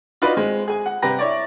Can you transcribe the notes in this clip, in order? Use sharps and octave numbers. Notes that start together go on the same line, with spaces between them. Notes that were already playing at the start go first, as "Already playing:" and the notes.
D#4 F4 F#4 B4 D5 D#5
G#3 C4
G#4 G#5
F#5
C3 G3 B4 G5 A#5 A#6
E4 C#5 D5